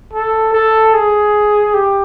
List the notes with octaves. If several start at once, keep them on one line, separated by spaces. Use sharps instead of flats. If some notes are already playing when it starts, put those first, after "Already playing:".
A4
A4
G#4
G4